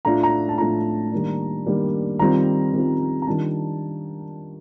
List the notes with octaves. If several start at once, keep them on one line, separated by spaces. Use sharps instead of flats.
A2 A3 D4 F4 A#5
A#5
A5
A2 A3 D4 F4 A#5
D#3 G3 A#3 D4
D#3 G3 A#3 D4
D#3 G3 C4 F4 A#5
D#3 G3 C4 F4
A#5
D#3 G3 D4 F4 A5